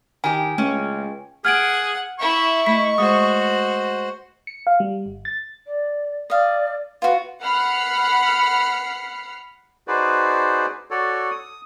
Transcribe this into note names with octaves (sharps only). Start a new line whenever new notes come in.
D#3 G4 G5 G#5
C#2 A3 C#4
G#4 F#5 F6 G#6 D7
E4 E5 C#6
A3 E4 D#5 B6
G#3 F#4 G#4 B4 C5 D#6
C#7
F5
G3
G1
A6
D5
D5 D#5 F5
F4 F#4 B4
F#5 B5 F6 C7 C#7
D#4 F#4 G#4 B4 C5 D5
F#4 A4 C#5 D5
D#6